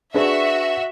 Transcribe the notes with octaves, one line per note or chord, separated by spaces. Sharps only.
D4 F#4 G#4 B4 E5